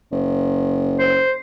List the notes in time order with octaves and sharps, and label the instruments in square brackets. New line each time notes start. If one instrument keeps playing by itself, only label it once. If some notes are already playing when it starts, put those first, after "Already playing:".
[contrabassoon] F#1
[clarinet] C5